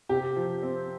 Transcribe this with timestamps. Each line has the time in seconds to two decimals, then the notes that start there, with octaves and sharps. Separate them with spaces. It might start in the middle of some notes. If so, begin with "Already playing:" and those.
0.09 C3 G4
0.36 F3
0.63 C4